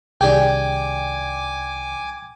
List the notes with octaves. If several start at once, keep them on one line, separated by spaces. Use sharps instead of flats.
C2 D#3 D4 G4 G#4 G5 G#5 D6